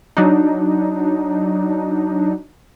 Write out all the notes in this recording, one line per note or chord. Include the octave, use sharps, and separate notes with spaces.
F#3 D4 D#4